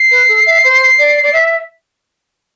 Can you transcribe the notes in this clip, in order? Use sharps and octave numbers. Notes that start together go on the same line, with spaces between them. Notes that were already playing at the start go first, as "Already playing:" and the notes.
Already playing: C7
B4
A4
E5
C5
D5
D5
E5